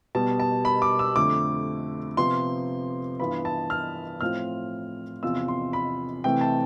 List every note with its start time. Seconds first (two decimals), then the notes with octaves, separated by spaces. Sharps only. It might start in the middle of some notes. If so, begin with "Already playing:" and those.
0.15 B2 G3 B3 A5
0.40 A5
0.65 B5
0.82 D6
0.99 E6
1.16 F2 D3 A3 D6
2.17 C3 F3 B3 C6
3.20 G2 E3 B3 F4 B5
3.45 A5
3.70 F6
4.21 A2 F3 C4 F4 F6
5.23 E2 C3 F3 C4 F4 E6
5.48 C6
5.73 B5
6.24 C3 E3 A3 C4 G5
6.41 A5